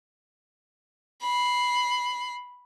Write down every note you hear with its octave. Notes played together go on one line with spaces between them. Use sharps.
B5 C7